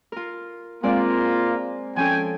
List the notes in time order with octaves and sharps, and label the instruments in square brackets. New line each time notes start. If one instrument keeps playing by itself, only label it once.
[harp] F4 A#4
[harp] G#3 C4 D5 [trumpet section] A#3 F4
[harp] F3 C#4 A4 [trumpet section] G5 G#5